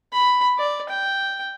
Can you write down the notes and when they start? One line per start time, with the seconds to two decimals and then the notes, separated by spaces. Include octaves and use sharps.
0.13 B5
0.58 D5
0.89 G5